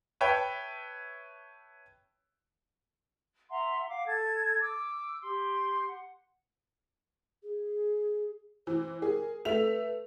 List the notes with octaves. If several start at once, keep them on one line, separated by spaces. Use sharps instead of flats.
B4 C#5 E5 G5 A5 B5
E5 F#5 A#5 C6
F5 F#5 D6
A4 G#6
D6 E6
G4 C6
F#5
G#4
E3 C5
G#4 A#4
A3 B4 E5 F7